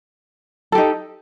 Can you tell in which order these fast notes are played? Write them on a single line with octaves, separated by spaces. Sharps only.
A4 G4 D#4